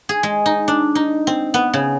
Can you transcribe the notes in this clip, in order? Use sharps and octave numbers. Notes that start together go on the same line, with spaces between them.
G#4
G#3
D#4
D4
D#4
C4
B3
C#3